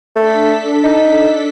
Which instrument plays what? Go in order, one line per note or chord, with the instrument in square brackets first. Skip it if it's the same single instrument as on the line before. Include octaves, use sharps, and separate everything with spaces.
[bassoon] A3 [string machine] D4 A4 B6
[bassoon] D#4